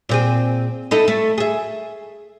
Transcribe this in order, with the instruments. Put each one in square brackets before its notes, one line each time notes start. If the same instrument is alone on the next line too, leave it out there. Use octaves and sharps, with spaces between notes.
[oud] A#2 C4 G#4
D#4 E4 A4
A3
G#4 E5